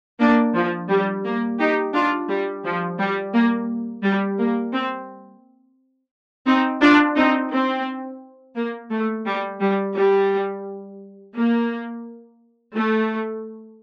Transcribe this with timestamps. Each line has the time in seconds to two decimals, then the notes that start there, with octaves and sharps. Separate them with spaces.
0.20 A#3 D4
0.55 F3
0.90 G3
1.25 A#3
1.59 D#4 G4
1.94 D4 F4
2.29 G3
2.64 F3
2.99 G3
3.33 A#3
4.03 G3
4.38 A#3
4.73 C4
6.47 C4 D#4
6.82 D4 F4
7.16 C4 D#4
7.52 C4
8.56 A#3
8.91 A3
9.26 G3
9.61 G3
9.96 G3
11.35 A#3
12.74 A3